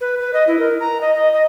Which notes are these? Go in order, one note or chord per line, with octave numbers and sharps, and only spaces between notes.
B4
B4
D#5
E4
A#4
A#5
D#5
D#5
D#5